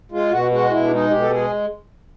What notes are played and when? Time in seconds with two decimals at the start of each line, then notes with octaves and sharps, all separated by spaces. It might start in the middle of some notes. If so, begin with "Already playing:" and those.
0.12 G#3 F4
0.31 B2 F#4
0.51 G#3 F#4
0.71 B2 E4
0.83 D4
0.91 G#3 D#4
1.10 B2 G4
1.21 A4
1.31 G#3 G#4